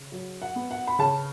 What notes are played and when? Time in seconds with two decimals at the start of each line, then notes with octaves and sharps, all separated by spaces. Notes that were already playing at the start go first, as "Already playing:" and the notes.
Already playing: C#3
0.12 F#3
0.42 F#5
0.56 B3
0.71 F#5
0.87 B5
0.99 C#3 A5